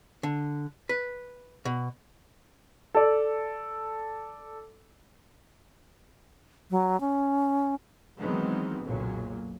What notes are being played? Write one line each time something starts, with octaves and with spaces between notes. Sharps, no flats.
D3
B4
B2
A4 D5
F#3
C#4
D#3 E3 F#3 G#3 B3 C4
F#1 B1 A#2 C#3 F#3